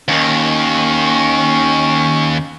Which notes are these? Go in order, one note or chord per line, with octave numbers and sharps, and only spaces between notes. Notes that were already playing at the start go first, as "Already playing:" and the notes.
D#2 D#3 C#4